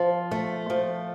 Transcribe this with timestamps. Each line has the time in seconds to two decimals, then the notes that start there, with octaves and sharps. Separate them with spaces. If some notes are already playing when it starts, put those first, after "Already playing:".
Already playing: F3
0.31 A3
0.70 F3